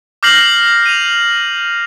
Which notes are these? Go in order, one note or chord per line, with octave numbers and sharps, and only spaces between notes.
D6 F6 G6 A#6 C7 F#7
D#7 F7